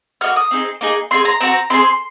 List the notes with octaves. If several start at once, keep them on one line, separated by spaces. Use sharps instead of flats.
A#3 D#4 F#4 F6
D#6
C4 D#4 G#4
A#3 D#4 G#4
C4 F4 G#4 C6
A#5
C4 F#4 A#5
C4 F4 G#4 C6